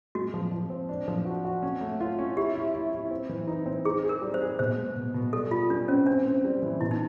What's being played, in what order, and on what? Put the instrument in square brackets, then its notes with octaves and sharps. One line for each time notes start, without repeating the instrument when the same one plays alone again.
[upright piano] G#3 [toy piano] F#4
[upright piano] F3
F3
C4
D4
F3
F#4
F#4
C#4
A3
F4
C#4
[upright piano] E4 [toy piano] G4
[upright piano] E4
E4
E4
C4
E3
D#4
C4
[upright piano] D#4 [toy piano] G#4
[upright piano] G#4
[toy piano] A#4
[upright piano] G3
[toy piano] C5
[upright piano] G#4
[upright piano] B2 [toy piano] C5
[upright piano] G#3
B2
B2
[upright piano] G3 [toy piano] A4
[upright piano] G3 [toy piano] F4
[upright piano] G3 [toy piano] D4
[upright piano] C4 [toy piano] C#4
[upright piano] C4 [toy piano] D4
[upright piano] C4
G3
E3
[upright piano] B2 [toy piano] E4
[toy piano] D#4